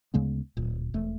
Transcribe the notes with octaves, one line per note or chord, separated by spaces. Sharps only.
D2 C#3 G#3 B3
D1 A#2
E1 A3